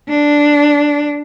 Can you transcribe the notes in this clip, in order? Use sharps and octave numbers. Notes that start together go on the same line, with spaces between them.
D4